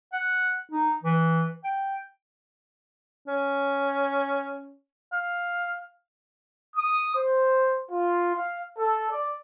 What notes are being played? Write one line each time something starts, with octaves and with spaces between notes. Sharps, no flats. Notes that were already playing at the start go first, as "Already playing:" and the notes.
F#5
D#4
E3
G5
C#4
F5
D#6
C5
F4
F5
A4
D5